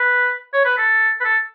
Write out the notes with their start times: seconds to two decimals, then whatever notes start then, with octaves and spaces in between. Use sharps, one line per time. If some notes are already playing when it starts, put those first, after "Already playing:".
Already playing: B4
0.54 C#5
0.65 B4
0.78 A4
1.20 B4
1.25 A4